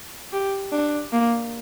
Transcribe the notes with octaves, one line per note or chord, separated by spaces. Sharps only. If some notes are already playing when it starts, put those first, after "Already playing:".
G4
D4
A#3